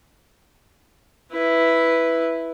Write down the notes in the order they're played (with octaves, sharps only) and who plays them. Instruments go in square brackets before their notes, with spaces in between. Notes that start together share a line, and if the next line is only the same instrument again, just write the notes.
[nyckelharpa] E4 B4